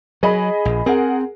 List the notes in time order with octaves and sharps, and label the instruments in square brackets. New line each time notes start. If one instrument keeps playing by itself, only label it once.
[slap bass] F#3 [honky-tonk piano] G#4 D#5 B5
[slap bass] A#1
[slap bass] C4 [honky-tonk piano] G#4 A#4 F#5